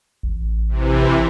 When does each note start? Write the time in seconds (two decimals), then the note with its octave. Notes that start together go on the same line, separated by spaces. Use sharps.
0.23 A1
0.69 C3 E3